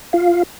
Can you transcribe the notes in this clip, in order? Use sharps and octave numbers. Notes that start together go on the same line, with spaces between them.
F4 F5